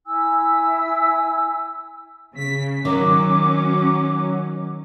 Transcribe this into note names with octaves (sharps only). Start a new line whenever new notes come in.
E4 G#5 E6
C#3 B6
D#3 F#3 C#4 D6